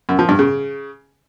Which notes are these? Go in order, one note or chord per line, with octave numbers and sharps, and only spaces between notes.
F#2
F3
G2
C#3